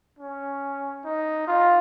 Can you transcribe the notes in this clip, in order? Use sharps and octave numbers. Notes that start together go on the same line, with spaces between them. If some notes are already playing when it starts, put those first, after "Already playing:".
C#4
D#4
F4